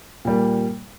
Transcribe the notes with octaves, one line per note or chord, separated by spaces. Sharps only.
A#2 G3 A#3